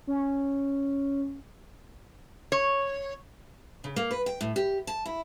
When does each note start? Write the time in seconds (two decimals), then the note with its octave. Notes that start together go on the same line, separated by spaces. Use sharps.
0.07 C#4
2.52 C#5
3.84 C#3
3.96 A#3
4.11 B4
4.26 G5
4.41 A2
4.56 G4
4.87 A5
5.05 E4